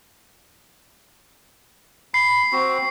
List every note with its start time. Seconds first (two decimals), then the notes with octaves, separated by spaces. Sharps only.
2.14 B5 C7
2.52 C4 F#4